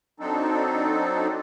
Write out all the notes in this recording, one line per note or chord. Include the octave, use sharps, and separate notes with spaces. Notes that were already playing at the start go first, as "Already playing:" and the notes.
F#3 C4 D4 D#4 A4